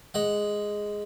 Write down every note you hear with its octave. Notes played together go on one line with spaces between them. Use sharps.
G#3 F#5